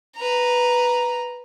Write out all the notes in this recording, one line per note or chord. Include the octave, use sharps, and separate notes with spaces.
B4 A#5